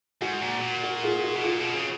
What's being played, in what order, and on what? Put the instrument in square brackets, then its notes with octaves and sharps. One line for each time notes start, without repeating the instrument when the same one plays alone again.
[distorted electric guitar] G#2 [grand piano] F#4
[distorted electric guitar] A#2
A#2
[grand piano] F#4
F4 G#4
F#4
[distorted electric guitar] B2
[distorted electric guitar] A#2 [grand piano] F4 G#4
[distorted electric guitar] B2
C#3